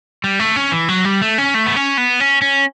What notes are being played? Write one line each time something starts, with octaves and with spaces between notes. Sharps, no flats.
G3
A3
C#4
E3
F#3
G3
A3
C#4
A3
B3
C#4
B3
C#4
C#4